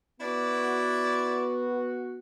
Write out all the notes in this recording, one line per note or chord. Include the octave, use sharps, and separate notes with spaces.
B3 E4 F#4 D5